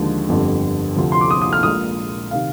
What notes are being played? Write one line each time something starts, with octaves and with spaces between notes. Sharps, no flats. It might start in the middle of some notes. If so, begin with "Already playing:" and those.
Already playing: D#2 D3 F3 G#3
G1 F2 D3 G3
D2 C3 F3
C6
D6
D#6
D#6
F6
A#1 A#2 G#3 D#6
C3 D#3 F5